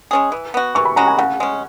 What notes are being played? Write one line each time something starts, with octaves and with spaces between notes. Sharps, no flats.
G#3 C#4 G#4
E3
B3 F#4
E3 C#6
B5
G#3 C#4 F#4 A#5
G#5
C#3 F#5
G#3 C#4